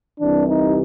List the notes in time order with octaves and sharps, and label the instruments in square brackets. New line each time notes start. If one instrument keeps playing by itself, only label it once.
[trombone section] C2 C3 E3 D4
D#4